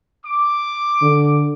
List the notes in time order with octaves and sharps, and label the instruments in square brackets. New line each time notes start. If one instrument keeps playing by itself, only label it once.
[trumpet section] D6
[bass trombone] D3